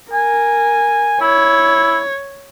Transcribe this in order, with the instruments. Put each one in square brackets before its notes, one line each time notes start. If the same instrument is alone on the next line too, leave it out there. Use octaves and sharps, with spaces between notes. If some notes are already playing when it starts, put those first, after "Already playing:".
[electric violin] A#4 [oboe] G#5
[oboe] E4 [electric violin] C#5